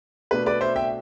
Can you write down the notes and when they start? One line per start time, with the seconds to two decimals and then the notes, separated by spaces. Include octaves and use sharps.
0.31 B2 A3 D4 B4
0.46 B4 D5
0.61 C5 E5
0.76 E5 G5